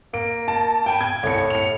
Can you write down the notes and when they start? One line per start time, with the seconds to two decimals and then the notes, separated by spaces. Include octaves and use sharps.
0.14 A#3 D7
0.48 A5
0.86 G5 G#5 B5
1.01 G#6
1.23 C2 A2 C#7
1.50 C#7 F7